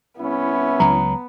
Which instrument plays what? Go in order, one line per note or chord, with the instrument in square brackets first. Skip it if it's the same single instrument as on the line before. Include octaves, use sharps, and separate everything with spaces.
[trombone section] C2 C#4 E4 [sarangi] B3
[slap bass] C#2 F#3 [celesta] A#5